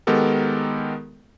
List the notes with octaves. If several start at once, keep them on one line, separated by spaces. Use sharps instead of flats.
D#3 G#3 B3 G4 A4 A#4